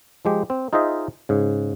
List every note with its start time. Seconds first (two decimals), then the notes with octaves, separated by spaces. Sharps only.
0.25 F3 G#3 G4
0.50 C4
0.73 D#4 F4 G#4 C5 D#5 E5
1.29 G#2 C#3